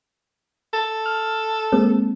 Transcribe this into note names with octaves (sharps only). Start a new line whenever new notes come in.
A4 A6
F6
G#3 A#3 C4